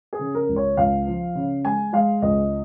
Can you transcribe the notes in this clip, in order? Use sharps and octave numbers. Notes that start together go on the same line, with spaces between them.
G#4
C#3
A#4
C#2
C#5
C#2 F5
F3
C#3
G#3 G#5
G#3 F5
C#2 D#5